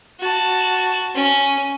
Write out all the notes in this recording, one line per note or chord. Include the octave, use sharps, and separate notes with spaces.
F#4 A5
C#4